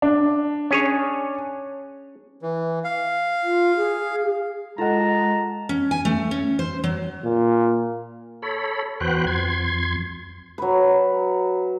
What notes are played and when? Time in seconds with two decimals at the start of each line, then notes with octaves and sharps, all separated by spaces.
0.02 D4
0.71 C#4 G#4 C#5
2.42 E3
2.84 F5
3.43 F4
3.76 G#4
4.78 G#3 F4 A4 D#5 F#5 A5 A#5
5.69 C#4
5.91 G#5
6.05 A3
6.31 C#4
6.59 C5
6.84 F#3
7.24 A#2
8.42 A4 C#5 B5
9.00 E2 F#4 B4 C5 G5 F#6
9.27 F2 C6 G#6
10.58 F#3 B4